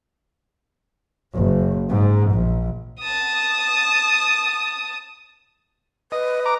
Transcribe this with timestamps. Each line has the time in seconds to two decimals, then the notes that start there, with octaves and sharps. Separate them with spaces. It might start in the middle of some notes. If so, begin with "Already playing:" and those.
1.33 F#1
1.89 G#2
2.33 A#1
3.00 A5 D#6
6.12 B4 D#5
6.46 A#5 D6